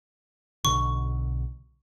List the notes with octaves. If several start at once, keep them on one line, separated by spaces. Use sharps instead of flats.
B1 B2 D3 C#6